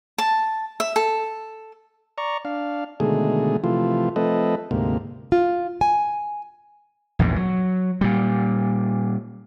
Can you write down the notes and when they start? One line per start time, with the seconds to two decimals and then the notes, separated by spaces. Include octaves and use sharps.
0.18 A5
0.80 E5
0.96 A4
2.18 D5 A#5 C#6
2.45 D4 F5
3.00 B2 D3 D#3 G#3 A3 G#4
3.64 C3 E3 F3 A3 F4
4.16 F3 A3 C4 A4 B4 D#5
4.71 D2 G#2 C3 A#3
5.32 F4
5.81 G#5
7.19 A#1 E2 G#2
7.36 F#3
8.01 A#2 G3